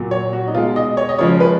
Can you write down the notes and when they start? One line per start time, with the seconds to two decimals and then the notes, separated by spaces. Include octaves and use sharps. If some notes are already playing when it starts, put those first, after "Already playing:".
Already playing: A#2 F#3
0.11 C#5
0.33 F#4
0.47 D#4
0.54 B2 F4
0.58 G#3
0.76 D#5
0.97 C#5
1.09 D#5
1.19 C#3 F3 G#3 C#5
1.40 B4